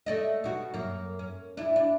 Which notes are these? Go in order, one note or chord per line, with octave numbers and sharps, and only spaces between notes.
A3 D5 D#5
B2 F#4
F#2 A#3
C#4
D4 E4
D4